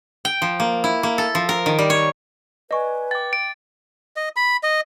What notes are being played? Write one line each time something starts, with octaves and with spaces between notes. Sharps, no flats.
G5
F3
A#3
E4
A#3
A4
F3
A#4
D#3
G3
C#5
B4 D5 D#5 G#5 C#6
G5 D6 A6
D7
D#5
B5
D#5